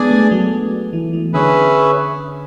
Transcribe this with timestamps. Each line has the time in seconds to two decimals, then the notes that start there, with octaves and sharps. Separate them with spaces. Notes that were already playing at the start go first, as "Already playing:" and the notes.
Already playing: G#3 B3 D4 G#4 D5 G#5
0.11 A3
0.31 F#3
0.93 E3
1.13 E3
1.33 D3 C#4 G#4 B4 E5